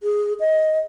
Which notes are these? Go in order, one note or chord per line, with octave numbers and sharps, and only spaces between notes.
G#4
D#5